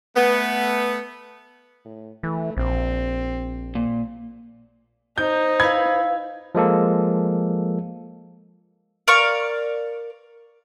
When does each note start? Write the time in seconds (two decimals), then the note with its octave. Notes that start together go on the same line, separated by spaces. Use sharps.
0.17 A3 B3
1.85 A2
2.23 E3 A3
2.57 A#1 C4
3.75 A#2
5.18 D#4 C5 G6
5.60 E4 B4 F5 B5 G#6
6.55 F3 G#3 A#3 A4
9.08 A#4 D5 F5 C#6